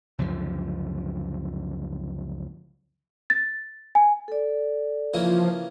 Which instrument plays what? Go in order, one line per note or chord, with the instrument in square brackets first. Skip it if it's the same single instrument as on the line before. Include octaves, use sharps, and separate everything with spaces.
[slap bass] C#2 F#2 D3 F3
[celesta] A6
G#5
[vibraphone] A4 D5
[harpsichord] C#3 E3 A#3 [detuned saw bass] F3